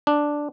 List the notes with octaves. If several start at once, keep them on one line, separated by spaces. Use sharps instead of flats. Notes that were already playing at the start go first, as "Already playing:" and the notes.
D4